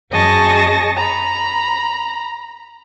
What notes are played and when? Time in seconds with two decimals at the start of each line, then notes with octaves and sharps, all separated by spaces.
0.11 F#2 G#4 D#5 A5 C#6 A#6
0.96 A#5 B5